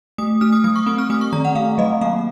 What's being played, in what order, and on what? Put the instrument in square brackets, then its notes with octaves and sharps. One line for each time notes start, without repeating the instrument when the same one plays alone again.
[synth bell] A3 D#6
A3 F6
D#6
F#3 D#6
C#6
C4 D#6
F6
A3 D#6
C#6
D#3 A#5
F#5
A3 F5
F#3 D#5
A#3 F5